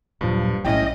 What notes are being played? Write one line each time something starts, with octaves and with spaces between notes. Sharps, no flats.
D#1 G2 A#2 F3 F#3
B1 A2 C#4 E4 D#5 G5